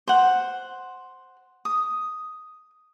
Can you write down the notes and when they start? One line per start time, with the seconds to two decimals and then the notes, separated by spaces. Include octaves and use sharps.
0.08 C5 F#5
1.65 D#6